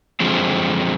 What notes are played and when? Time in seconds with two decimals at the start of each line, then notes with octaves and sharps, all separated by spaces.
0.20 F#2 D3 F3 G#3 C4